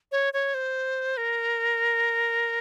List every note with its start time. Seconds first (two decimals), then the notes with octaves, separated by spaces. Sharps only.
0.12 C#5
0.33 C#5
0.54 C5
1.17 A#4